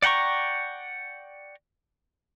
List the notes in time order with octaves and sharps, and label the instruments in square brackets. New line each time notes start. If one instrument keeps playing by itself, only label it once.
[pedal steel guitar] D5 F#5 G5 A#5 C#6